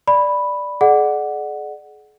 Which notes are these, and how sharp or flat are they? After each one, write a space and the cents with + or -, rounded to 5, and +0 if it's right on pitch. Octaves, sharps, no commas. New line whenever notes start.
D5 +0 B5 +0
G#4 +40 D5 +30 F#5 +0